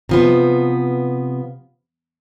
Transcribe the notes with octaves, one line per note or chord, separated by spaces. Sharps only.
C3 F3 B3